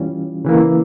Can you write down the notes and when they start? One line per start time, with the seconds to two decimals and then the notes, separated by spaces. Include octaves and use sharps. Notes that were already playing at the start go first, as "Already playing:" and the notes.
Already playing: E3 G3 C#4 F4
0.45 C#3 E3 A#3